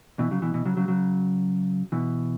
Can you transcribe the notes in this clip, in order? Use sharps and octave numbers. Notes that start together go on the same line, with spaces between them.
B2 E3
C#3 F#3
B2 E3
B2 E3
C#3 F#3
C#3 F#3
C#3 F#3
B2 E3